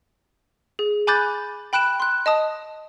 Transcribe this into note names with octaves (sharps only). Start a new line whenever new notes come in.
G#4
G#5 B5 D6 F#6 G6 A6
G5 B5 F#6 D7 E7
C6 F#6
D#5 A5 D#6